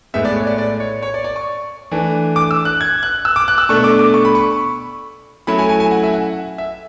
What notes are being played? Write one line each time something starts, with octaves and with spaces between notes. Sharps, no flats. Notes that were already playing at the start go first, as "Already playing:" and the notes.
A2 G#3 B3 E5
D5
C#5
D5
D5
C#5
C#5
D5
D5
C#6
E3 A3 D4
D6
E6
F#6
G#6
F#6
E6
D6
F#6
E6
B2 A3 D4 C#6
D6
D6
C#6
B5
C#6
F#3 A3 C#4 E4 B5
G#5
G#5
G#5
F#5
E5
F#5
E5